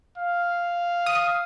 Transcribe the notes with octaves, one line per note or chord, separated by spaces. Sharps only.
F5
D#6